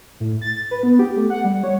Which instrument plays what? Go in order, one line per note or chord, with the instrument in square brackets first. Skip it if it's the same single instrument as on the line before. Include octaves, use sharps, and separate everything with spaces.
[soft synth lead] A2
A6
B4
B3
G4
A3
F#5
G3
C#5